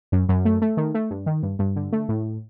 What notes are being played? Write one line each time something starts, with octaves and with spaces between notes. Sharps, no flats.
F#2
F#2
A3
A3
D#3
A3
G2
D#3
G2
G2
D3
A3
A2